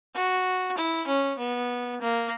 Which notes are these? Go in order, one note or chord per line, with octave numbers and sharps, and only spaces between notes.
F#4
E4
C#4
B3
A#3